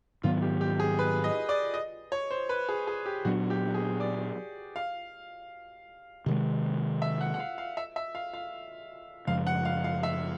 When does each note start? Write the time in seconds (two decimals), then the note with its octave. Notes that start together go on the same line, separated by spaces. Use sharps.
0.23 G#2 D#3 F#3 B3 F4
0.42 G4
0.61 G4
0.80 G#4
0.99 B4
1.24 D#5
1.49 D5
1.74 D#5
2.12 C#5
2.31 C5
2.49 B4
2.69 G#4
2.87 G#4
3.06 G4
3.25 A#2 F#3 B3 D4 F#4
3.50 G4
3.74 G#4
4.00 D5
4.76 F5
6.26 C3 D#3 G#3
7.02 E5
7.21 F#5
7.34 F#5
7.39 F5
7.58 F5
7.77 E5
7.96 E5
8.15 F5
8.34 F5
9.27 F#2 C#3 F3 G#3 F5
9.47 F#5
9.65 F5
9.84 F5
10.03 E5